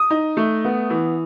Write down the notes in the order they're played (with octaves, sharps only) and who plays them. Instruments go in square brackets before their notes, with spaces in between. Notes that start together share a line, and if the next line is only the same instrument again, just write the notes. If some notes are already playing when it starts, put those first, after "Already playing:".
Already playing: [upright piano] D#6
D#4
A3
B3
E3